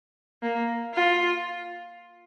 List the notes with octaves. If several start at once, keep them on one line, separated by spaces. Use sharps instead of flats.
A#3
F4